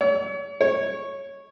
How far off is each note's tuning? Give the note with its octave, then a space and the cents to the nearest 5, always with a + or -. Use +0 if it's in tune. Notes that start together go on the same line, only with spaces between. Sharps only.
C#5 +35
C#5 -10